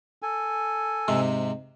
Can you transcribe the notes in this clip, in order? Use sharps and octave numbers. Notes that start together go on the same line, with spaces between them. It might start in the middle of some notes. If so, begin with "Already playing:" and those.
A4 G#5
G#2 C3